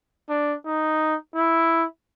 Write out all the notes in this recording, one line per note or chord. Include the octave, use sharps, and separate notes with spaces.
D4
D#4
E4